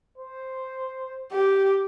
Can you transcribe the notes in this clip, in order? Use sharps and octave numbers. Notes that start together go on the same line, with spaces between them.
C5
G4